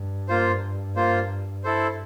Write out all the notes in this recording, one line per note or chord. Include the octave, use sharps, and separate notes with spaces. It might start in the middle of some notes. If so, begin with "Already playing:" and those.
Already playing: G2
A#3 F4 C5
A#3 F4 C5
E4 A4 C5